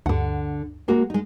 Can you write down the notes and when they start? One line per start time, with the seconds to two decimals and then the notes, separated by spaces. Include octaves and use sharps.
0.06 D2 G2 D3 F#5
0.88 G#3 A#3 F#4
1.10 G#3 D#4